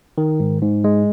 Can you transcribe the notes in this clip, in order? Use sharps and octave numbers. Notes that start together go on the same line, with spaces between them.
D#3
G#2
G#2
G#3